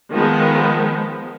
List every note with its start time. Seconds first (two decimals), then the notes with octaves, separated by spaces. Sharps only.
0.12 D#3 F3 G#3 B3